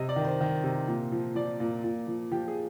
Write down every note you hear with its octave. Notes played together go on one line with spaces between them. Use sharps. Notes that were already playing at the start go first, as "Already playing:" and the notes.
Already playing: C3 D#5
D5
D#3
C5
D#3
C3
A#2
F3
F3 D5
A#2
A#2
F3
F3 G4
G#4